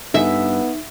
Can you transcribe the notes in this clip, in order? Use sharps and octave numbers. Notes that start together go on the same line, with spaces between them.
G2 B3 D#4 A4 E5 G#5